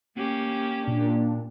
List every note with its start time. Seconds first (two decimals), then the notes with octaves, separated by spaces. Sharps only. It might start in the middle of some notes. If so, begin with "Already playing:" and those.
0.17 A#3 C#4 G4
0.83 A#2 D4